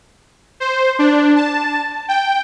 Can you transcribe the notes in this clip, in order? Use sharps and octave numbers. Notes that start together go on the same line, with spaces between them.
C5
D4
A5
G5